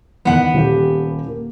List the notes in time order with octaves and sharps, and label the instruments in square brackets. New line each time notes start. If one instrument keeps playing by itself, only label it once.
[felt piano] E2 D#3 [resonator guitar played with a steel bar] B3 F#5
[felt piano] D#1 G4
A#3